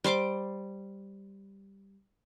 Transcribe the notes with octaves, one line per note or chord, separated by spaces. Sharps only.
G3 C5 C6 D6